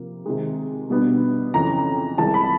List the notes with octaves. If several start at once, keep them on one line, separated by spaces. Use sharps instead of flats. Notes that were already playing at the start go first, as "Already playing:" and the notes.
Already playing: C3 F3 A#3
C3 D#3 G#3
B2 G3 B3 D4
F2 C#3 E3 A#5
C2 C3 E3 G#3 A5
B5